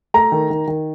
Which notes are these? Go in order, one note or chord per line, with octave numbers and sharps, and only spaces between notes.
A3 A#5
D#3
D#3
D#3